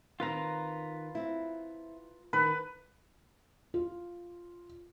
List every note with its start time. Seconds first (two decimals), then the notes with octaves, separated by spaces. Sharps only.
0.20 D#3 C4 F4 B4 A#5
1.15 C4 E4
2.33 D#3 B4
3.74 F4